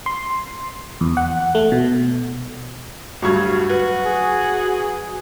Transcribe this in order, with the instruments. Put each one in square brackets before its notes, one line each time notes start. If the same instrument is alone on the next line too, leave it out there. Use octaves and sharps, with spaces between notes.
[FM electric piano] C6
E2
F#5
A3
B2
[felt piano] D2 G2 [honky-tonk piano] F#3 C#6 G#6
[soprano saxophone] F#4 [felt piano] B4
[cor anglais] G#4